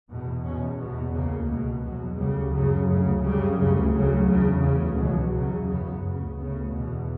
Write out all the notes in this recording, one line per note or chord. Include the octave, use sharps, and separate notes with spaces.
E2 B2
E2 B2 C#4
E2 B2 B3
C#3 A#3
D2
C#2 B2
E2 B2 F#3
D2 C#3 G3
F#2 C#3 F#3
D2 C#3
F#2 C#3 G3
D2 C#3
D2 C#3 F#3
E2 C#3
D2 C#3 E3
C#2 B2 F#3
E2 C#3 F#3
F#2 C#3 B3
D2
C#3
D2 C#3 B3
E2 B2